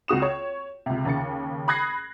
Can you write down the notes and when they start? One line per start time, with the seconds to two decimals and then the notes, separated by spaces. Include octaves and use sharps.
0.08 C#2 C4 F#4 D#6 E7
0.22 C#5
0.86 C#2 C3
1.05 D#2 C#3 A6 C#7
1.68 B5 D#6 F#6 G#6 A#6 C7